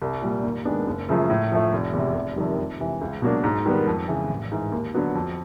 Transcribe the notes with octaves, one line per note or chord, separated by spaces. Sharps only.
C2
A#2 G3
D#2
D#3 G#3 B3 D4
F#1
F#2 C#3 F3 A3
A2
F3 A3
F1
E2 C3
F1
F2 C3 D#3 G3
F2
C3 E3
C#2
B2 F#3 A#3 D4
G#2
D#3 G3 B3
F2
C#3 E3
A1
G#2 E3
D#2
D3 F#3 B3
F2